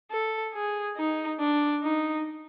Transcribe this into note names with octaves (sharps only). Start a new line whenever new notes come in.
A4
G#4
D#4
D4
D#4